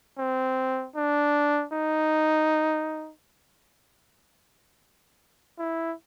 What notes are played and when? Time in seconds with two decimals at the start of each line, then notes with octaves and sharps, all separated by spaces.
0.18 C4
0.96 D4
1.73 D#4
5.59 E4